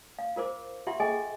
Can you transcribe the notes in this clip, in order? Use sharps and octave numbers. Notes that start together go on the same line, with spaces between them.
F5
F4 A#4 C5 D6
F4 G4 E5 F#5 C6
G#4 A4 D#5 G5 G#5